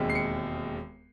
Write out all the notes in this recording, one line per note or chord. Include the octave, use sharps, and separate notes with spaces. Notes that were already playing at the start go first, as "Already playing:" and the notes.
Already playing: E1 D#2 D#3 G#3 C4
C7
C#7